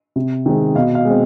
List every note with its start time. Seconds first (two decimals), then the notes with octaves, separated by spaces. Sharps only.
0.16 C3
0.46 D#3 G#3 C4
0.75 B2 D#5 F5
0.95 D#5 F5
1.05 G#3 C4